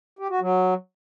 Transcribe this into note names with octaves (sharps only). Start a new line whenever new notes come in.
G4
F#4
F#3